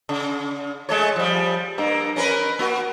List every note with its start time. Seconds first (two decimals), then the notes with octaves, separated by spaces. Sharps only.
0.09 C#3
0.89 G#3 A3 C#5
1.16 F3 G3
1.78 G2 A#3
2.16 C#4 A#4 B4
2.59 A#3 F#4